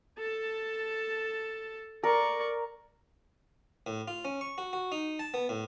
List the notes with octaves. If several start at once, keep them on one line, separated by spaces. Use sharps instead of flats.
A4 A5
A#4 D5 C#6
A2
F4
C#4
C#6
F#4
F#4
D#4
A5
B3
A2